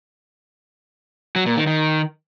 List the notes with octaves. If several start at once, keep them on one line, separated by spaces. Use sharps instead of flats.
F#3
A#2
D#3
D#3